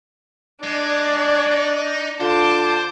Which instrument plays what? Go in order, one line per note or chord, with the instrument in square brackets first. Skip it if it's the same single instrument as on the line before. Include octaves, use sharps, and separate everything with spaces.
[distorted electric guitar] G#3 [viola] D4 [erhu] D5
[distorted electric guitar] D#4
[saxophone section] D3 D4 F4 [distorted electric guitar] C5 [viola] A5 D6